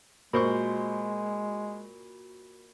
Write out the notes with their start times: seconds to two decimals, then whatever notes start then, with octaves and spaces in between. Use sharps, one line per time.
0.33 A#2 G#3 F#4 A#4 C5 B5 C#6